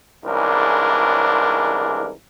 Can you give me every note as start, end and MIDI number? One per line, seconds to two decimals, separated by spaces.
0.25 2.11 36
0.25 2.11 44
0.25 2.11 49
0.25 2.11 52
0.25 2.11 62
0.25 2.11 70